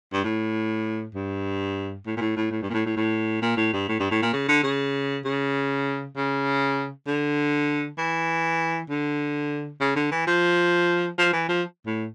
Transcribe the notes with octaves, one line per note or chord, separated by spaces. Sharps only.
G2
A2
G2
A2
A#2
A2
A2
A2
G2
A#2
A2
A2
A2
A#2
A2
G2
A2
G2
A2
A#2
C#3
D3
C#3
C#3
C#3
D3
E3
D3
C#3
D3
E3
F3
F3
E3
F3
A2